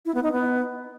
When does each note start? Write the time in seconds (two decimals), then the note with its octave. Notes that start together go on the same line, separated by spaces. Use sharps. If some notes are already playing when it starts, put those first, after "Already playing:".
0.06 E4
0.14 B3
0.23 D#4
0.32 B3